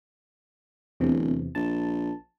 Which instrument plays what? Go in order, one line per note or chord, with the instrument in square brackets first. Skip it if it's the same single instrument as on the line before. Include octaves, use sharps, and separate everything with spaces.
[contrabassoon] D1 [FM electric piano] E2 C3 E3
[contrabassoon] A#1 [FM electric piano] A5